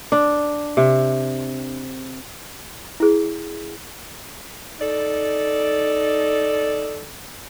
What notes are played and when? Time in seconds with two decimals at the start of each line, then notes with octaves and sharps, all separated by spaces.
0.12 D4
0.77 C3
3.00 E4 G#4
4.80 D#4 A4 D5